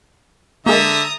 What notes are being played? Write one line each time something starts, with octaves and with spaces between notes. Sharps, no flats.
D3 G#3 A#3 E5 A#5 D#6